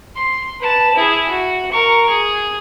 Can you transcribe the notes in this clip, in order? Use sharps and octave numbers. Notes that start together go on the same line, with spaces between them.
C6
B4 A5
E4 G#4
F#4
A#4 C#6
G#4